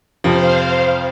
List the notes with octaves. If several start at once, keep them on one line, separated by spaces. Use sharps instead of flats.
F2 C3 F3 C5 F5